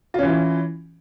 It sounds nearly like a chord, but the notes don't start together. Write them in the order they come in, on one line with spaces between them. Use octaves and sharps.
F4 C#4 E3 E4